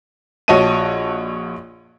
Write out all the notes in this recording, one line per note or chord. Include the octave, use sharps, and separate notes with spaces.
A#1 F#4 C#5 D#5 A5 D#7